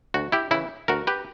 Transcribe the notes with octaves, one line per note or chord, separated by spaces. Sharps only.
D2 F#4
E4 G4
C#3 E3 E4
D2 F#4 A#4
G4 B4